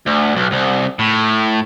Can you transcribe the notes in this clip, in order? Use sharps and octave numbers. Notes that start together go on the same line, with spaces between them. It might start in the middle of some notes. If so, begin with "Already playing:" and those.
D2
B1
C2
A2